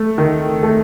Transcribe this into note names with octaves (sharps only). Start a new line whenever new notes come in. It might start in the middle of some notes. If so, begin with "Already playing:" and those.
Already playing: A3
D#3
A3